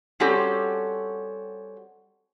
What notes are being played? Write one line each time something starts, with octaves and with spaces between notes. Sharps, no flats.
G3 C4 C#4 F#4 G4 A4